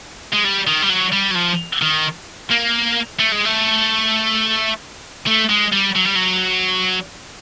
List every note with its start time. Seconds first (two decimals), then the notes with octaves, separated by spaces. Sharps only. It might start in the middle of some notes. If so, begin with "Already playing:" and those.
0.33 G#3
0.44 G3
0.67 D#3
0.82 G3
0.90 F#3
1.13 G3
1.31 F#3
1.36 F3
1.82 D#3
2.50 A#3
3.19 A3
3.32 G#3
3.45 A3
5.27 A3
5.49 G#3
5.72 G3
5.95 F#3
6.06 G3
6.15 F#3